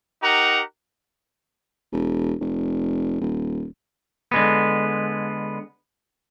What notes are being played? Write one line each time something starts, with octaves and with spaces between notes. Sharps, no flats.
D#4 G4 A#4 F#5 A#5
E1
F1
D#1
D3 G#3 B3